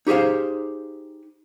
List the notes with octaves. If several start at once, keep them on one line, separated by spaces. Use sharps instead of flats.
D#4 G4 G#4 C5 F5